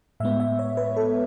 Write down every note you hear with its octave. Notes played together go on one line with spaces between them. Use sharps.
A2 G#3 B3 E5
E5
C#5
B4
A4